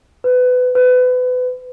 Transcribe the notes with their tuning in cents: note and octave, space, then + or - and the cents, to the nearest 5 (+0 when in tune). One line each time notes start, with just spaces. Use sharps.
B4 +25
B4 +30